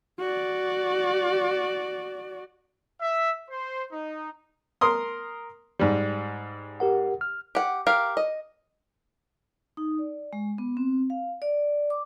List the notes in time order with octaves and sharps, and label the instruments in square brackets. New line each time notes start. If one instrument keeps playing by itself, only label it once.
[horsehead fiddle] F#4 D5
[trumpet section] E5
C5
D#4
[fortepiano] A#4 C6 D#6
G#2 G3
[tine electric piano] G4 A#4 F#5
F6
[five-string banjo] G4 F#5
G4 A#4 F5
D#5
[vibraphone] D#4
D5
G#3
B3
C4
F5
D5
D6